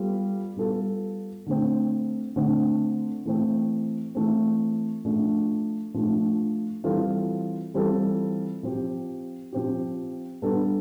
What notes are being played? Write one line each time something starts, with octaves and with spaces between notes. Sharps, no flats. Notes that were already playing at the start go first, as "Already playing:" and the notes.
Already playing: G3 B3 F4 A4
G3 B3 F4 A4
D3 A3 C4
D3 A3 C4
E3 A3 C4
E3 A3 C4
F3 A3 D4
F3 A3 D4
E3 G3 C4 F4 A4
E3 G3 C4 F4 A4
F3 C4 G4
F3 C4 G4
G3 B3 D4 A4